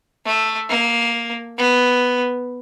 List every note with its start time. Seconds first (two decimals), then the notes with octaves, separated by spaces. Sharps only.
0.26 A3
0.69 A#3
1.58 B3